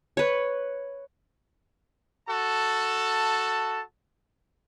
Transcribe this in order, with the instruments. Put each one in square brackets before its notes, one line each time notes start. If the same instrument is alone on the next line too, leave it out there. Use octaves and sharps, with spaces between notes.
[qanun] B4 C#5
[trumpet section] F#4 A4 A5